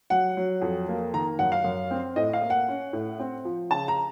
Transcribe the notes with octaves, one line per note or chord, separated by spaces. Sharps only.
F#3 F#5
F#3
F2
A#3
D#3 A#5
F#2 F#5
F5
F#2
C4
A2 D#5
F5
A#3
F#5
C#4
A2
C4
F3
C#3 A5
A#5